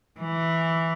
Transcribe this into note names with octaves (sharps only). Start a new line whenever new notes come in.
E3